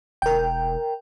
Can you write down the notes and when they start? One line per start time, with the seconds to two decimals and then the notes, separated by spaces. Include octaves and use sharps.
0.22 E1 A#4 G5